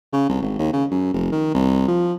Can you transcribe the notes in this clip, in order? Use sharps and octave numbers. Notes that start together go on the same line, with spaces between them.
C#3
C2
G#1
D#2
C#3
F#2
F1
D#3
C2
F3